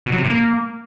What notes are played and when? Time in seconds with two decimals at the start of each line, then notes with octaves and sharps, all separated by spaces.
0.06 B2
0.12 F#3
0.18 C3
0.24 A2
0.30 A#3